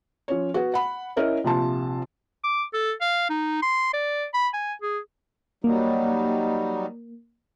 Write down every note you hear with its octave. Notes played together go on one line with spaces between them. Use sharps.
F3 C#4 C#5
B3 F#4
F#5 B5
C#4 E4 A#4 C#5 D#5
A#1 C3 F4 A5
D6
A4
F5
D#4
C6
D5
B5
G#5
G#4
F#3 G3 A#3 D#4